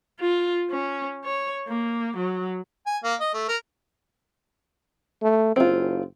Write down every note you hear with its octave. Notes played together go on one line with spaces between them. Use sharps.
F4
C#4
C#5
A#3
F#3
G#5
A#3
D#5
A3
A#4
A3
F#1 C4 F4